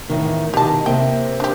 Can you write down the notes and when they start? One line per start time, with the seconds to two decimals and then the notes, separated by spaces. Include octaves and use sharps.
0.09 E2 A2 D#3
0.54 B2 D#3 G4 A5
0.86 C3 A#3 C4 G5
1.40 D4 G4